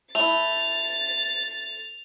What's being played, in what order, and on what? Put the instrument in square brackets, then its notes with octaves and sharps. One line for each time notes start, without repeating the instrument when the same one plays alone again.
[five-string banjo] A3 E4 [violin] A6 [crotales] F7